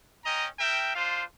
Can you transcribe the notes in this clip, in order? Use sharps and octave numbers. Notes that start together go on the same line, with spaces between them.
C#4 D#5 G5 A#5
A#4 E5 G5
D4 F4 C5 F5